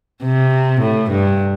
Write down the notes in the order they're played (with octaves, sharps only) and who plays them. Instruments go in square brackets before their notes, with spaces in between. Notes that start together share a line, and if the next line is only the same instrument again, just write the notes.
[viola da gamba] C3
A2
G2